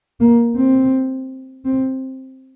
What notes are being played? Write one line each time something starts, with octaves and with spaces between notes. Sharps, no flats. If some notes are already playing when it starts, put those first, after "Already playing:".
A#3
C4
C4